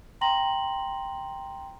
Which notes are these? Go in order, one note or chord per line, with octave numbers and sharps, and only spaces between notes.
G5 A#5 C6 A#6 F#7